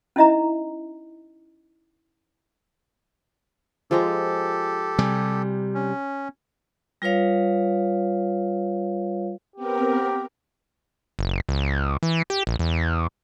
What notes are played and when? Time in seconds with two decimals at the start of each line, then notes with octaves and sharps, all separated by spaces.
0.16 C#4 D#4 E4 D#5 E5 A#5
3.91 F3 G#3 G4 A4 A#5
4.99 C3 G3 G#5
5.74 C#4
7.02 G3 F4 B4 C#5 F5
9.56 B3 C4 G4 A#4
11.19 F#1
11.49 C#2
12.03 E3
12.30 G4
12.47 A#1
12.59 E2